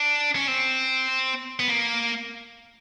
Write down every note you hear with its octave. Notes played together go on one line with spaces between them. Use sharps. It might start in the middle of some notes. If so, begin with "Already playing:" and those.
Already playing: D4
C#4
C4
B3
A#3